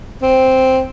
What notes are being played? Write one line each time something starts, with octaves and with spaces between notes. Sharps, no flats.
C4